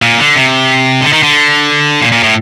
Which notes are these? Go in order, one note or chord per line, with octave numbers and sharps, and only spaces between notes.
A#2
D3
C3
D3
D#3
D3
A#2
A#2
A2